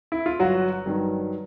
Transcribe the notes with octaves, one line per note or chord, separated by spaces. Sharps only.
E4
F4
G1 F#3 F#4
G2 D#3 F#3